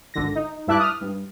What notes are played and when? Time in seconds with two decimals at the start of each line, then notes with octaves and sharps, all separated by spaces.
0.14 G#1 D3 A#6
0.35 D#4
0.67 G2 E4 E5 A5 D6 F#6
0.80 D#6 F6
1.01 G2